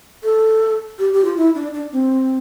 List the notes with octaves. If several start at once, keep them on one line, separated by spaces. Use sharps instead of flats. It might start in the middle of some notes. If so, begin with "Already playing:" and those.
A4
G4
G4
F4
E4
D4
D4
C4